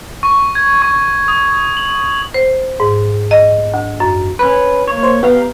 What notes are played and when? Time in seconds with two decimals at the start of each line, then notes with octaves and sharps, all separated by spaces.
0.23 C#6
0.55 G#6
0.82 C#6
1.28 D#6
1.77 F#7
2.34 C5
2.80 G#2
3.31 D#5
3.74 D2
4.00 F#2
4.39 C#4 B4
4.88 A#3 C#5
5.03 C5
5.23 B3 G4 F5 A#5